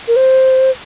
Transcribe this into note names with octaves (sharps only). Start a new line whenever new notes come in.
A#4
C5